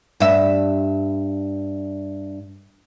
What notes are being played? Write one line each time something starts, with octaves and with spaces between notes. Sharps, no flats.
G2 E5